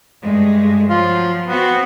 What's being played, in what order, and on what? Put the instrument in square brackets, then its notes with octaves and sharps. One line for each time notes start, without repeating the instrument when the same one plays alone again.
[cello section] G2 G#3 A3
[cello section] F3 F#3 [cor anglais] F4
[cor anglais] B3 [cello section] C4 F#4